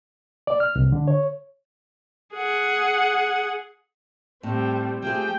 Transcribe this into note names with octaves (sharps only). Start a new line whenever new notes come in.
D5
F6
C2
D3
C#5
G#4 F#5
A2 G3 C4
F3 A3 G4 G#4 G5